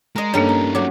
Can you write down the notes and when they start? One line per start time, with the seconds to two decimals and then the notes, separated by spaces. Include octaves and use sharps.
0.16 G#3 A#4 D#5
0.34 G2 A#3 C#4 D#4 A4 A#4 C#5
0.49 A#5
0.75 F#3 A3 D6